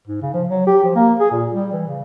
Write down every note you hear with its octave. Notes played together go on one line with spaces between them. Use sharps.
G#2
C#3
F3
F#3
G4
F3
A#3
G#4
A#2
G3
E3
C#3